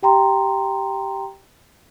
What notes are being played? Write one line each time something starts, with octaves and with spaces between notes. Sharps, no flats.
G4 G5 A#5 C6